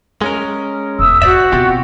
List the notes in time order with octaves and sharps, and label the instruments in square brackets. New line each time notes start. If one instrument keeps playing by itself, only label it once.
[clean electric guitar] G#3 C#4 A#4
[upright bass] E1 [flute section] E5 D#6 E6
[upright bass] G#2 [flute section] F#4 [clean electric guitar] C5 D5 E5
[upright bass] B2 [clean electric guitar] C4 F4 G4